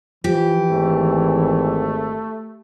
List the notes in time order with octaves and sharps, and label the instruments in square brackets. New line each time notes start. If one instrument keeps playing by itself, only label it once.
[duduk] E3 [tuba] F3 [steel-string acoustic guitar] G4
[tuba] G#1 [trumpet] A3